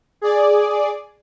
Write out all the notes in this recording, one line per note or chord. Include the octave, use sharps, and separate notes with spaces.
G#4 D5